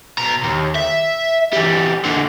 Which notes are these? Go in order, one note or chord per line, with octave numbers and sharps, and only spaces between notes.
B2 A#5
D#2
E5
E3 G3
D3 A#3